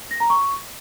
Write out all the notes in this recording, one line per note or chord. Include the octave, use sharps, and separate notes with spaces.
A#6
A#5
C#6